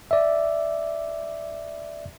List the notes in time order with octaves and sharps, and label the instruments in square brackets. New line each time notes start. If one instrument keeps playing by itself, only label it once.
[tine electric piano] D5 E5